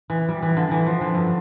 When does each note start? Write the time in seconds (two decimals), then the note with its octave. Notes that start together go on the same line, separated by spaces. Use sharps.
0.10 E3
0.29 G3
0.43 E3
0.57 D3
0.71 E3
0.86 F3
1.01 D3
1.15 G2